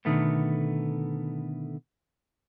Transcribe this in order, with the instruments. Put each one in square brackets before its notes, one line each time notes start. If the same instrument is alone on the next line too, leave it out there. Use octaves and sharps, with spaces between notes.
[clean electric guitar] B2 D3 D#3 A3 B3